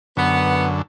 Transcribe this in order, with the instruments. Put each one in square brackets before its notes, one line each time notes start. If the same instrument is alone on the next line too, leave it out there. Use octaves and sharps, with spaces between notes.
[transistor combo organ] F#2 D3 [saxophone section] B3